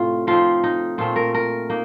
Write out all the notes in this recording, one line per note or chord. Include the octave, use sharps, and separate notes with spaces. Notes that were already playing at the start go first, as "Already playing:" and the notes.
Already playing: A2 C3 A3 C4 F4
F3 C4 D#4 F4
D#4
A#2 A3 C4 F4
A#4
A#4
A#3 D#4